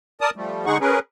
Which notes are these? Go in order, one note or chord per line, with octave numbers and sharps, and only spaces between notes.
A#4 D5 A5 D#6
F3 G3 A3
D3 G#3 D#4 G#4 F#5 C#6
C#4 G#4 A#4 B4